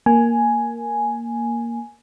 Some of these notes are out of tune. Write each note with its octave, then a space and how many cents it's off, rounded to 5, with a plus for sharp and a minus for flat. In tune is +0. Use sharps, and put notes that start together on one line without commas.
A#3 +0 G#5 +5